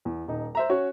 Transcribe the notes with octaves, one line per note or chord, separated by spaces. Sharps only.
E2
D#1 D#4
C5 E5 A#5
C#4 F#4 C#5